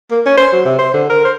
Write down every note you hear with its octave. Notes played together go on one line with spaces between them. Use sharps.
A#3
C#4
C5
F#3
C3
C5
D3
A#4
C5